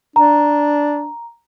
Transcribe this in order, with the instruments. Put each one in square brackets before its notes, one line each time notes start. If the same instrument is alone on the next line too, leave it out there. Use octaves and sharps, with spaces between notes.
[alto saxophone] D4 [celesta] A#5